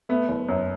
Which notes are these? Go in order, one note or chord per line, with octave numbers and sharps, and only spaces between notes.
A3 B3
F#1
F#2